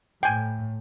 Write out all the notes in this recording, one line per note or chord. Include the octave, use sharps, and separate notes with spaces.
A2 G5 G#5